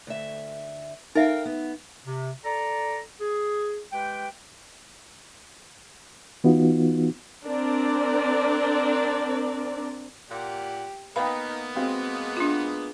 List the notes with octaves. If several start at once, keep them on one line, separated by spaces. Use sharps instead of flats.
D2 E5
D#4 A#4 E5 F5 G5
B3
C3
A4 D5 A#5
G#4
G#3 G4 B4 G5
E3 B3 D#4 F4 F#4
C4 D4 A#4 D5
A#2 G4 F#5
A#3 B3 D#4 B4 F5 G5 B5
G#3 C4 F#4 F5
D4 F4